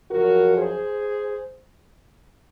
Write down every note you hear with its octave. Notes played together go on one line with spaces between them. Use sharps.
F#2 C#3 F3 F#4 A#4
G#4 C5